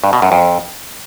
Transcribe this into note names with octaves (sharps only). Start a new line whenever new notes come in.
G2
B2
F#2
F2